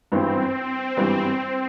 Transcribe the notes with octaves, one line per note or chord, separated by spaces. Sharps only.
G#1 G2 E3 G3 B3 C4
G#1 G2 E3 G3 B3